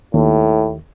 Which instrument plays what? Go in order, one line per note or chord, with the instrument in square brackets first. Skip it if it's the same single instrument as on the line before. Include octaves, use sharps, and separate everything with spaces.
[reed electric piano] D#2 [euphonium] A2